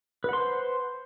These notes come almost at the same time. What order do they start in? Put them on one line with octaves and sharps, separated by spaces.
B4 F#5 C6 C5